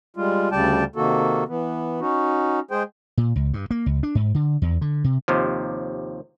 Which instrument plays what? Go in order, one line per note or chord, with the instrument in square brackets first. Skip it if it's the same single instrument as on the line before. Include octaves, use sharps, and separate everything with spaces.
[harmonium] G3 G#3 F4
D2 C#3 G3 D5 G5 A5
C3 D#3 A#3 F#4 A4
E3 B3
C#4 D#4 F#4
G#3 G#4 C5 G5
[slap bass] A#2
C#2
G2
A#3
C#2
D4
G#2
D3
E2
D3
C3
[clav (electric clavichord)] D#2 C3 F3